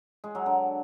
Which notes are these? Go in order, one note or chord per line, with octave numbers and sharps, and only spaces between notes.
G#3
F#3
D3